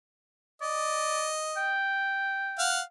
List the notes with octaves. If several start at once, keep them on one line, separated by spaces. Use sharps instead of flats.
D5 D#5
G5
F5 F#5